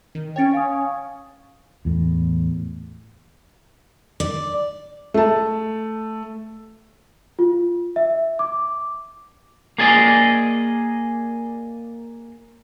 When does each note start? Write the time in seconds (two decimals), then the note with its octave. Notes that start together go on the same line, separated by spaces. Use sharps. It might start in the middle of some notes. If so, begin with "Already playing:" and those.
0.15 D#3
0.36 C#4 C#5 G5 A6 D7
0.54 F5 G#5 D#6
1.85 E2 A2
4.20 D5
5.14 A3 A5
7.39 F4
7.96 E5
8.39 D6
9.78 A#3 G#4 D5 D#5